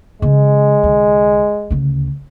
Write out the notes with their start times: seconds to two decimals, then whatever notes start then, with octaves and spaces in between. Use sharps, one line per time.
0.22 C#3 E3 G#3
0.83 C2 D3
1.71 D2 C#3